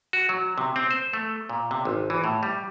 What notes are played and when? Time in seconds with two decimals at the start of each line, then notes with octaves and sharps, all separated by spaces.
0.13 F#4
0.29 F#3
0.58 C3
0.76 C4
0.91 C5
1.13 A3
1.49 A#2
1.71 C3
1.85 G#1
2.10 E3
2.24 A2
2.43 G3